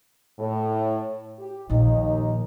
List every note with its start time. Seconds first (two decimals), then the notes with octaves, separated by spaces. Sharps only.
0.39 A2
1.39 G4
1.70 A#1 D#2 A#2 D#4